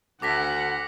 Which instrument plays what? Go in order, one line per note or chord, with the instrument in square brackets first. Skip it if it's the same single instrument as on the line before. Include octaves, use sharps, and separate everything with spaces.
[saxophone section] D2 [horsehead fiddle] F#5 [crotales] D6 A#6 B6